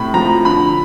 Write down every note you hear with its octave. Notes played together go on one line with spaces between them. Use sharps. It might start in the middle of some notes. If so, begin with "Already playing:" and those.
Already playing: A2 C3 B5
F3 A#5
D3 B5